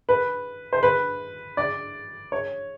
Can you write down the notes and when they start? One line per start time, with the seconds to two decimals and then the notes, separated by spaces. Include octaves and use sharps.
0.09 B4
0.73 C5
0.83 B4
1.57 D5
2.32 C#5